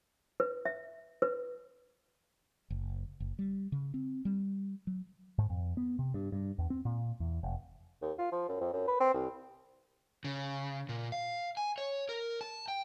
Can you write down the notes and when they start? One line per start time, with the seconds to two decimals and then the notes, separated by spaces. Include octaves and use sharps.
0.40 B4
0.65 E5
1.22 B4
2.70 F#1
3.20 F#1
3.39 G3
3.72 C#3
3.94 C4
4.25 G3
4.87 F#3
5.38 G#2
5.50 F2
5.77 B3
5.99 C3
6.14 G2
6.32 G2
6.59 E2
6.70 C4
6.85 A#2
7.20 E2
7.43 F1
8.02 D#2
8.18 F4
8.32 F3
8.48 F#2
8.61 F2
8.73 F#2
8.88 B4
9.00 C4
9.14 C2
10.24 C#3
10.89 A#2
11.12 F5
11.57 G#5
11.78 C#5
12.09 A#4
12.41 A5
12.68 G5